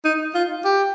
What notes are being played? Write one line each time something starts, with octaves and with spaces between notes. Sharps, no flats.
D#4
F4
G4